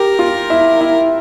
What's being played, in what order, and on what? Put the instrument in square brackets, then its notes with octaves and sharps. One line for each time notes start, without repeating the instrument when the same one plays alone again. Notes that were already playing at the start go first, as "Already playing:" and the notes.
Already playing: [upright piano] G4 [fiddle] A#4
[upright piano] F4
E4
E4